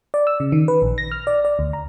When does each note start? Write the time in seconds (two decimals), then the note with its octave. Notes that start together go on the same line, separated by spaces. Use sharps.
0.14 D5
0.27 E6
0.40 C#3
0.52 D#3
0.68 B4
0.82 A#1
0.98 A#6
1.12 F6
1.27 D5
1.45 D5
1.59 D2
1.73 A#5